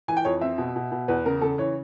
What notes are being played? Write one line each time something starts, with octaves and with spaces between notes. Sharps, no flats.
E3 G#5
G5
F2 C#5
C4 E5
B2
B2
B2
E2 B4
C#3 A#4
C#3 A4
E3 C#5